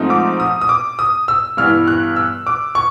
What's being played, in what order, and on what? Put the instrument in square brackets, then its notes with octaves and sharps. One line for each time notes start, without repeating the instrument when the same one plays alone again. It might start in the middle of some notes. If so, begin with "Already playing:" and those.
Already playing: [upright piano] G#2 F3 A3 C4 D#4
D6
D#6
D#6
D6
D#6
E6
G2 E3 G3 B3 F6
F#6
E6
D6
C#6